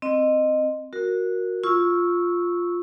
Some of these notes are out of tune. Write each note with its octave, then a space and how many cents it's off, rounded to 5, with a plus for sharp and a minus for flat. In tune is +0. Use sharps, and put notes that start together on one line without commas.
C4 +0 D#5 -15
F#4 -10 A#4 +0
F4 +0 C#6 +0 E6 -15